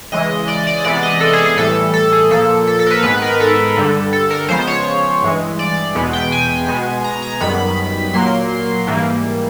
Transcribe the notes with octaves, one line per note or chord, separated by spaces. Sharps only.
C#3 E3 G#3 D#5
D5
D5
C3 E3 G#3 B3 D5
D#5
A4
G#4
G#4
A2 E3 G3 A4
A4
G#4
A#2 F3 A#3 A4
A4
A4
A#4
B4
G#2 D#3 G#3 B3 B4
A#4
A4
G2 D3 G3
A4
A#4
C#3 F3 G#3 B3 C5
C#5
G2 E3 G#3
D5
E2 B2 G#3 B3
G5
G#5
B2 G#3 B3
A#5
A#5
F#2 D#3 G3 B3 B5
A#2 F#3 A#3 C6
G#2 E3 G3 A#3